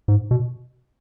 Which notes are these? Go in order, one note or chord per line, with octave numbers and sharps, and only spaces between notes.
G#2
B2